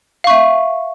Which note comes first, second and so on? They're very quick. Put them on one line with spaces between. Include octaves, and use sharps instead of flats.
F5 C#6 E5